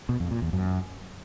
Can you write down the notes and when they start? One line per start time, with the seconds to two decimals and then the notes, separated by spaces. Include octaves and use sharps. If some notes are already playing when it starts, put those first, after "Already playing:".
0.09 B2
0.20 F2
0.31 A#2
0.42 E2
0.53 F#2